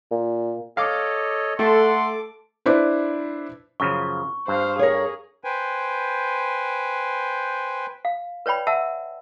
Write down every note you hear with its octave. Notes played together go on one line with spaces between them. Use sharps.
A#2
A4 C#5 D#5 F5 D6
A3 A4 F#5 C6 D6
D4 E4 B4 C5
F#2 C#3 F3 C#6
G2 C5 F5
G#4 A#4 C#5
B4 C5 G5 G#5
F5
B4 C#5 D5 G5 B5
E5 F#5 A5 E6